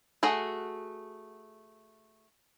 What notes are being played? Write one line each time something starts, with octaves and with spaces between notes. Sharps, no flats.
A3 F#4 G#4 F#5